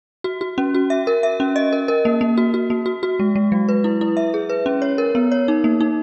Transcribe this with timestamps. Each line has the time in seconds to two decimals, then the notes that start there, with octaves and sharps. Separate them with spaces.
0.24 F#4
0.41 F#4
0.58 C#4
0.75 F#4
0.90 E5
1.07 A#4
1.23 E5
1.40 C#4
1.56 D#5
1.73 A#4
1.88 A#4
2.05 A#3
2.21 A#3
2.37 F#4
2.54 F#4
2.70 A#3
2.86 F#4
3.03 F#4
3.20 G#3
3.36 G#3
3.52 F#3
3.69 B4
3.84 E4
4.01 E4
4.17 E5
4.34 G#4
4.50 B4
4.66 C#4
4.82 C#5
4.98 A#4
5.15 B3
5.32 C#5
5.48 D#4
5.64 A#3
5.80 D#4